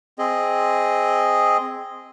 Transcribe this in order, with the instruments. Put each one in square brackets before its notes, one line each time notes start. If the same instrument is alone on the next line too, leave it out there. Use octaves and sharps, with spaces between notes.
[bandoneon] C4 G#4 D#5